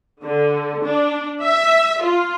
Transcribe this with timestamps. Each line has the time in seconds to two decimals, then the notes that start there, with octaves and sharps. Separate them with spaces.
0.23 D3
0.83 D4
1.42 E5
2.03 F4